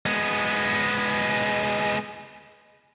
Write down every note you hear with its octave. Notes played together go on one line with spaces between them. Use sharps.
G#3 B3